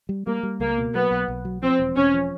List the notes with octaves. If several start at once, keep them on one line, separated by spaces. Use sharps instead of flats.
G3
G3 A#3
G3
C#2 A#3
B2
F#3 B3
B1
B1
F#3
F3 C4
E1
E1 C#4
F3